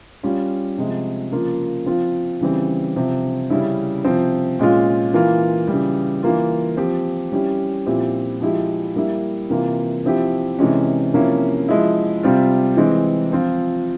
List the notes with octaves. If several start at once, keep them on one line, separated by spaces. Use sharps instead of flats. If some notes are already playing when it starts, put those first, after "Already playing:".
G3 C#4 F4
C3 F3 G#3
C#3 F3 A#3 F4
F3 C4 F4
C#3 E3 G3 C4
C3 F3 C4
C#3 G3 C#4 E4
C3 F3 C4
A#2 G#3 C#4 F4
E3 A#3 F4
C#3 E3 G3
E3 A#3 F4
F3 C4 G4
G3 C#4 E4 G4
A#2 F3 C4 E4 G4
F3 G#3 E4 G4
G3 A#3 E4
C3 E3 A#3 F4
F3 C4 E4 G4
C3 E3 G#3 C#4
C3 F3 A#3 C#4 E4
F3 G#3 E4
C3 G3 C4 F4
E3 G#3 C4
F3 C4 F4